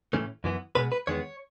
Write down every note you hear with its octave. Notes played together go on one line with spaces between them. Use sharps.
A2 E3 A3 C#4
F#2 E3 B3
B2 G#3 B3 B4
B4
E2 D#3 G#3 B3 C#5